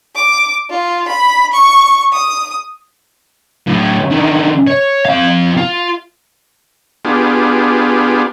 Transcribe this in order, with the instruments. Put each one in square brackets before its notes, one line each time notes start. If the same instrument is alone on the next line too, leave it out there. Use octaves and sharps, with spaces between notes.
[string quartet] D6
F4
B5
C#6
D#6
[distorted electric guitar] A2 D3
D3 D#3
C#5
C4 F5
F4
[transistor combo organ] B3 D4 F4 G4 G#4